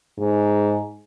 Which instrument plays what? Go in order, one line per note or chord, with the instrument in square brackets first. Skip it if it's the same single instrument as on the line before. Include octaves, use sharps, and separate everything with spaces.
[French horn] G#2